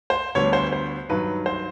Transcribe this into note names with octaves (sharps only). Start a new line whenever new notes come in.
C5
D2 D3 G3 B3 C#5
C5
C5
G2 D#3 F#3 B4
C5